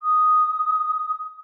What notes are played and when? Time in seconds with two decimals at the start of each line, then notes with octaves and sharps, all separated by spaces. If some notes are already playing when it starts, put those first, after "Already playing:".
0.02 D#6